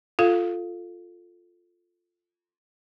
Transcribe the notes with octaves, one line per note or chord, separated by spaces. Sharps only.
F4 A4 F5